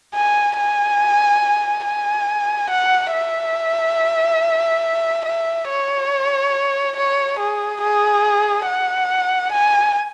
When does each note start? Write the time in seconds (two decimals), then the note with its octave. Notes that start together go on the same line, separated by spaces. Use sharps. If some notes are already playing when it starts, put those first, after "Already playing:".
0.15 G#5
0.58 G#5
1.85 G#5
2.70 F#5
3.13 E5
5.25 E5
5.69 C#5
6.97 C#5
7.39 G#4
7.81 G#4
8.66 F#5
9.52 G#5